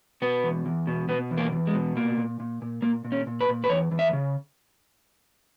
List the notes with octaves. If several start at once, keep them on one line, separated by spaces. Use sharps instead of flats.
B2 B3
E2
E2
B2
B2 B3
E2
A#3
E2
G#3
B2
A#2 A#3
A#2
A#2
A#2
A#2 A#3
A#2
C#4
A#2
B4
A#2
B4
E2 C#5
E2
E5
C#3